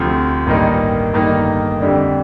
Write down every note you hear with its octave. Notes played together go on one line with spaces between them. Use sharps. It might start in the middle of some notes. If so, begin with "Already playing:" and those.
Already playing: D2 C3 F3
A1 G2 D#3 A#3 D#4
G1 G2 D#3 A#3 D#4
F2 D3 G3 D4